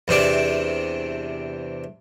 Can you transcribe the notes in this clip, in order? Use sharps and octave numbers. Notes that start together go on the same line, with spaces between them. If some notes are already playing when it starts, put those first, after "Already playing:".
E2 C3 D4 D5